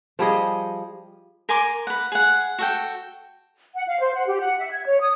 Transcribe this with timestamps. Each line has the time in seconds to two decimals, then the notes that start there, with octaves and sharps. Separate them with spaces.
0.19 F3 G3 G#4 D#5
1.49 A#4 G#5 C6 D6
1.87 B4 F#5
2.12 G#4 F#5
2.59 F#4 A4 G5
3.75 F#5
3.88 F5
4.01 C5
4.14 F#5
4.26 G4
4.41 F#5
4.58 E5
4.73 G#6
4.86 C#5
5.00 D#6